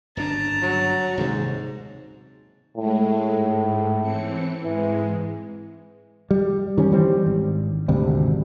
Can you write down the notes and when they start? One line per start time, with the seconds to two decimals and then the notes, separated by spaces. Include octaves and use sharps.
0.17 G1 C#3 D4 A5 A#5
0.62 F#3
1.17 D#1 G#2 C3
2.78 A2 G#3 A3
3.35 G#2
4.01 E3 C4 C#7
4.63 G#2 E3 G#3
6.31 G3
6.78 D#3 G3 C#4
6.91 E3 G3 C4
7.26 G#1
7.88 G#1 D2 C3 G3